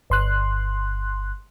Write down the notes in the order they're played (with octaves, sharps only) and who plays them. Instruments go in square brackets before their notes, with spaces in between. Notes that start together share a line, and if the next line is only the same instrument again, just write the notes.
[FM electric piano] G1 C6 F#6